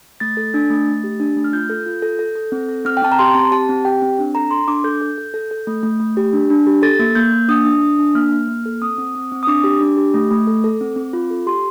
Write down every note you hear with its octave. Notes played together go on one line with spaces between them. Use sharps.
A3 A6
A4
D4
A3
A3
G4
D4
A3
F6
F4 G6
A4
F4
A4
A4
A4
C4
A4
C4 F6
G5
C4 A5
A#5
G4 C6
C4 A5
G4 A5
C4
G4 G5
C4
D4
A4 A#5
A4 C6
D4 D6
A4 G6
A4
A4
A4
A4
A3
A3
A3
G4
D4
D4
G4
A4 A6
A#3
A#3 G6
A#3
D4 D#6
D4
D4
D4
A#3 F6
A#3
A#3
A4
C4 D#6
C4
C4
C4
D#6
D4 D6
G4
D4
G4
A3
A3
A4
A4
C4
C4
F4
A4
G4 C6